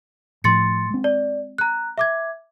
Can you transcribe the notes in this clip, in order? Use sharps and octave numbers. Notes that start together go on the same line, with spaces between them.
A2 F3 C6 A6 C#7
G#3 C4
D5
A#5 F#6
E5 D6 G#6